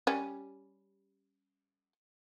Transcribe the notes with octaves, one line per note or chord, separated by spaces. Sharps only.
G3 C#4